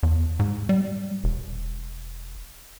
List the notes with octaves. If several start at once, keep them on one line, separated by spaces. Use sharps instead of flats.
E2
G#2
G3
E1